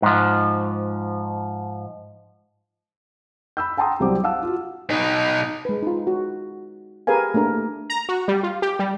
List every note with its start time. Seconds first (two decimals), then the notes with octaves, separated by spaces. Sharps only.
0.02 G#2 F3
3.57 B5 E6 G6
3.77 F#5 G5 A5 A#5 C6 D#6
4.00 C2 F#3 G3 C4 D6
4.24 F5 F#5 A5 E6
4.43 F4 F#4
4.90 B2 D#4
5.65 G#3 B4
5.83 D#4 F4
6.07 F#4
7.07 G4 G#4 A#4 B4 F5 G#5
7.34 A3 A#3 D4 A#4
7.90 A#5
8.09 F#4
8.28 G3
8.43 F4
8.62 G4
8.79 G3